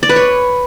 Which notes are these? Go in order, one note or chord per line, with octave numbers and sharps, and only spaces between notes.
D5
B4
C#5